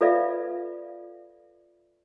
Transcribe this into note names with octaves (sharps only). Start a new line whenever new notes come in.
F4 A4 B4 D5 E5 F5